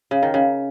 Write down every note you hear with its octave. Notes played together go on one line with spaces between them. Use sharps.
C#3
D#3
C#3